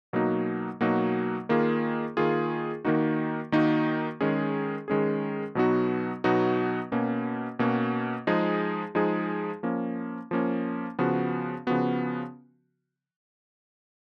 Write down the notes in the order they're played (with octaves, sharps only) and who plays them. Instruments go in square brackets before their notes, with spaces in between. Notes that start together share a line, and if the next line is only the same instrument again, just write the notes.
[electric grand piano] B2 F#3 A#3 D#4 F#4
B2 F#3 A#3 D#4 F#4
D#3 A#3 F4 G#4
D#3 A#3 F4 G#4
D#3 A#3 D#4 F#4
D#3 A#3 D#4 F#4
D#3 G#3 C#4 G#4
D#3 G#3 C#4 G#4
B2 F#3 B3 D#4 F#4
B2 F#3 B3 D#4 F#4
B2 A#3 C#4 F#4
B2 A#3 C#4 F#4
F3 G#3 D#4 G#4
F3 G#3 D#4 G#4
F3 A#3 C#4
F3 A#3 C#4
C#3 F3 B3 F#4
C#3 F3 B3 F#4